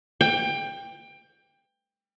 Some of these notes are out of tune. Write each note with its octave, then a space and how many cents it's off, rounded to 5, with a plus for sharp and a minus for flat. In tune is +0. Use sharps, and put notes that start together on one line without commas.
G5 +20